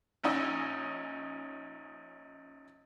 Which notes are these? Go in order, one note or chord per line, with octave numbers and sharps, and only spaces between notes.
A#1 C#4 D#4 D#5 E6